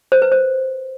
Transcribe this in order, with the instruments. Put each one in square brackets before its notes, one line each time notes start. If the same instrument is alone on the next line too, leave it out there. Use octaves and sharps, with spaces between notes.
[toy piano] C5
B4
C5